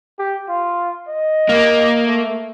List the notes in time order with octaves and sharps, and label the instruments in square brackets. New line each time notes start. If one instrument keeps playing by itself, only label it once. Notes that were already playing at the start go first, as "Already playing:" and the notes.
[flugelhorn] G4
F4
D#5
[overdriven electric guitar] A#3
[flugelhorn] A3